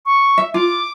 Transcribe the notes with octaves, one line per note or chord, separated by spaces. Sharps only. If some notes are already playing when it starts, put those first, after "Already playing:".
C#6
E5
F4 D6